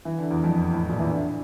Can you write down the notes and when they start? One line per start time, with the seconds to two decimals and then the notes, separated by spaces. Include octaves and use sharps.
0.05 E3
0.18 D3
0.31 E2
0.44 F2
0.73 A2
0.89 A#2
0.99 E3
1.07 D3